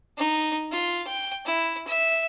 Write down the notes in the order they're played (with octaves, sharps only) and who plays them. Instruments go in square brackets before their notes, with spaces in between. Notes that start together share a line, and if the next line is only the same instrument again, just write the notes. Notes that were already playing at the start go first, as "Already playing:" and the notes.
[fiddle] D#4
F4
G5
E4
E5